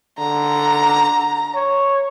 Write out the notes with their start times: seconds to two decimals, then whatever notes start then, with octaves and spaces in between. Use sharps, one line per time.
0.19 D3 A#5
1.55 C#5